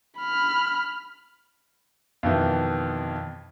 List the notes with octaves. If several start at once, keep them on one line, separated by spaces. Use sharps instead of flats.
B5 F6
F2 B2 D#3 E3